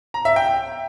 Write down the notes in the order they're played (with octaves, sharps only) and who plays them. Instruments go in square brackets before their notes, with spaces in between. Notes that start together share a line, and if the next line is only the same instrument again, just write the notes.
[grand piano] A#5
E5
G5